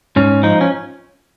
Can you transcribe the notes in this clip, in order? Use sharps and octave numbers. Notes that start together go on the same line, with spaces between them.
G#2 C#4
F3 D#4
C#4